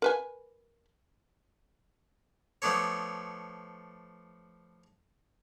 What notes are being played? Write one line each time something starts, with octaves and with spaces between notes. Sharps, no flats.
A#4 B4 G#5
F3 A3 B3 D4 A4 C#5